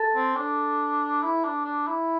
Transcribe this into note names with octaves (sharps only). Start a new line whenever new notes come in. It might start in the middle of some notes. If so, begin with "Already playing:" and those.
Already playing: A4
C4
D4
E4
D4
D4
E4